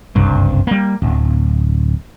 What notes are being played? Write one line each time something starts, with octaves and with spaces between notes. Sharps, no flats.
F#1 C2 G2
G3 A#3
D1